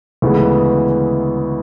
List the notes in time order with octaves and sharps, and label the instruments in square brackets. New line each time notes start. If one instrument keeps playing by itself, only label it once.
[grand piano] D2 C#3 E3 G#3 B3